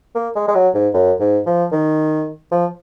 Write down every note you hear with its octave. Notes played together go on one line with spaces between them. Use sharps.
A#3
G#3
G#3
F#3
G#2
F#2
G#2
F3
D#3
F3